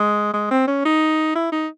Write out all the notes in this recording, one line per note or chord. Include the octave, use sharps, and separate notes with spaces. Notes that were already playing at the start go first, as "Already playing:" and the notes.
Already playing: G#3
G#3
C4
C#4
D#4
E4
D#4